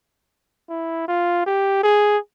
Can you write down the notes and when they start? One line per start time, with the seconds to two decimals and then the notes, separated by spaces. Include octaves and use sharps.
0.69 E4
1.08 F4
1.46 G4
1.83 G#4